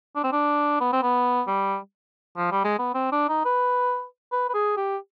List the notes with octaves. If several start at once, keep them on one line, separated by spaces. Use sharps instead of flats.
D4
C4
D4
B3
C4
B3
G3
F3
G3
G#3
B3
C4
D4
D#4
B4
B4
B4
G#4
G4